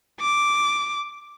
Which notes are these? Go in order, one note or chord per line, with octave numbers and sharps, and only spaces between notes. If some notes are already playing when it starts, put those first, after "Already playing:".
D6